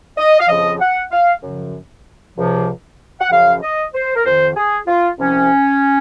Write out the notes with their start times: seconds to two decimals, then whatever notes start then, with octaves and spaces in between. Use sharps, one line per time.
0.18 D#5
0.40 F5
0.49 F2 C#3 F3 D#5
0.81 F#5
1.11 F5
1.43 F#2 C#3 F3
2.37 C#2 C3 F3
3.21 F#5
3.31 F#2 C#3 F3 F5
3.62 D#5
3.94 C5
4.16 A#4
4.25 F2 D#3 C5
4.56 G#4
4.87 F4
5.19 C2 C3 F3 C#4